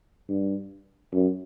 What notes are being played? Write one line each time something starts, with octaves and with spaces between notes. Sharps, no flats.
G2
F#2